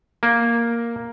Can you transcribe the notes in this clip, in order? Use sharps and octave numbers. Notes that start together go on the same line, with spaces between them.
A#3